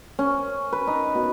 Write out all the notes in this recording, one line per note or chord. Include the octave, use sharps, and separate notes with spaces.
C#4
B4
D#4
B2